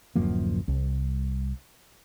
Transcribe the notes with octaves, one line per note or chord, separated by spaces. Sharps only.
D1 F#2 F3 A#3
C2